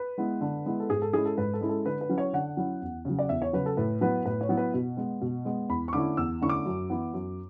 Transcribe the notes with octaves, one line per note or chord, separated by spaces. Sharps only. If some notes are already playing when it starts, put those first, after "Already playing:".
Already playing: B4
G#3 B3 E4
D3
G#3 B3 E4
A4
G#2 G#4
A4
G#3 C#4 E4 G#4
A4
G#2 B4
A4
G#3 C#4 E4
A4
D3 B4
B4
F#3 C#4 E4
C#5
D3 F#5
F#3 C#4 E4
E2
C#3 F#3
D5
E2 E5
C#5
C#3 F#3 B4
A4
A2 B4
F#3 B3 E4 B4
A2 B4
C#5
F#3 B3 E4
B4
B2
G#3 B3
B2
G#3 B3
E2 B5
C#6
D3 A3 C#4 E4 D6
E2 E6
D3 A3 C#4 E4 C#6
D6
F#2
E3 B3 E4
F#2